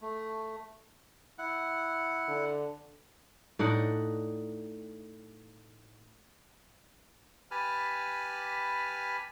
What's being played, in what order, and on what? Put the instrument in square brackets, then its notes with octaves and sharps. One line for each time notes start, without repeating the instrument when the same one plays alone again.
[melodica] A3
E4 F#5
[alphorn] D3
[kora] A2 D4 D#4 F#5
[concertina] G4 B4 G#5 A5 B5 F6